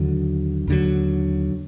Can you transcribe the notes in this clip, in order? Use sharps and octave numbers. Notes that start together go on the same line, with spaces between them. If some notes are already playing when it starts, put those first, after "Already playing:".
Already playing: D#2 D3 F#3
D#2 D3 F#3